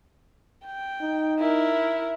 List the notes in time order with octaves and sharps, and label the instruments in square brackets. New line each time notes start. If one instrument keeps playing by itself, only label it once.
[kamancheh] G5
[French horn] D#4
[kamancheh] E4 A#4